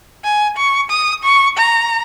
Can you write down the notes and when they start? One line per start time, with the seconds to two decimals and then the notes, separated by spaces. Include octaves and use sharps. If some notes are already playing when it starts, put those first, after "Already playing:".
0.24 G#5
0.57 C#6
0.90 D#6
1.24 C#6
1.57 A#5